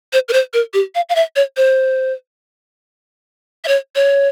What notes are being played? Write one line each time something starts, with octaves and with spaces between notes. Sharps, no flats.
C5
A#4
C5
A#4
G4
F5
F5
E5
C#5
C5
E5
C#5
C#5